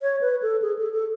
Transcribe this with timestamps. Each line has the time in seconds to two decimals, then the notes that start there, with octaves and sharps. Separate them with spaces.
0.02 C#5
0.21 B4
0.42 A4
0.62 G#4
0.79 A4
0.93 A4